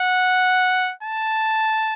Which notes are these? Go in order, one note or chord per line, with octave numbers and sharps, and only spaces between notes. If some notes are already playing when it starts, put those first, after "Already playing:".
Already playing: F#5
A5